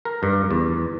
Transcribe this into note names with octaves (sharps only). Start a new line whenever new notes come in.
A#4
G2
E2